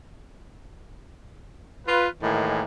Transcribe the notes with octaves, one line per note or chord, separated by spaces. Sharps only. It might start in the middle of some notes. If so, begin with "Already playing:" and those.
F4 B4
A2 D#3 E3 G#3 A#3